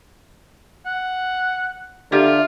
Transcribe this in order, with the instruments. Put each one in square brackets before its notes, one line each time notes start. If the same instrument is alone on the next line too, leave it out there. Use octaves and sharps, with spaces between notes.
[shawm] F#5
[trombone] D3 [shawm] F4 [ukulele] G4 A#4 E5